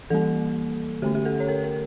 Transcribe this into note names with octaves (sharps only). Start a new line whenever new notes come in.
E3 G3 A#3 A4
D3 A3 C#4 G4
G4
A4
C#5
A#4
A#4